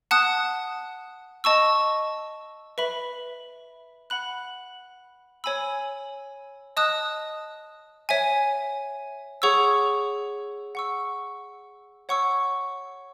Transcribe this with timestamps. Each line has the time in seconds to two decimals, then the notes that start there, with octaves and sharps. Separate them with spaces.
0.11 F#5 A5 D#6 F#6
1.44 D#5 A5 C#6 E6
2.78 B4 E5 B5
4.10 F#5 B5 F#6
5.44 C#5 G#5 B5 E6
6.77 D#5 A5 D#6 F#6
8.09 C#5 E5 G#5
9.42 G#4 C#5 F#5 C#6 E6
10.75 F#5 C#6 E6
12.09 C#5 F#5 C#6 E6